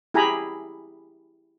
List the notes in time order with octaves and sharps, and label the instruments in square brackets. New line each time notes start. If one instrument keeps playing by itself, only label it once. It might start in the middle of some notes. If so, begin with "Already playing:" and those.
[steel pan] E4 G4 G#4 G#5 A#5 B5